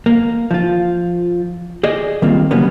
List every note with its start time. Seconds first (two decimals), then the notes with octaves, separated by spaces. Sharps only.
0.06 A#3
0.51 F3 F4
1.83 G#4 D5 D#5
2.22 D#3 G3 A#3 C4 F4
2.51 C#3 F#3 G3 A#3 B3 C#4